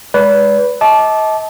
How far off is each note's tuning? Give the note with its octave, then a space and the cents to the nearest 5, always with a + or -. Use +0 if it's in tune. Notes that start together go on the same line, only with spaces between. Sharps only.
G#3 -10 B4 +0 D5 -40
D#5 +40 A5 -20 D6 +0